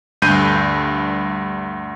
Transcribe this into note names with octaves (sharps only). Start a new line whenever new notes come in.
D2 G2 G6 D#7